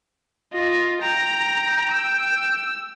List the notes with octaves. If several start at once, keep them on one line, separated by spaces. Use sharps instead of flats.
F4 D#5
G5 A#5
E6